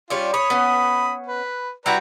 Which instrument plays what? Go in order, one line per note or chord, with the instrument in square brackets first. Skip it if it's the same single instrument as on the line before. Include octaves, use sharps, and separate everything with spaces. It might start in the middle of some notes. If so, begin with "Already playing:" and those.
[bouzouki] G3 C#4 D4 [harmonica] F4
[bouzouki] C#5 [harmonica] B5 D#6
[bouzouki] B3 C#4
[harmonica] B4
[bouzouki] G3 E4 F#4 [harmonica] B4 D5 A#5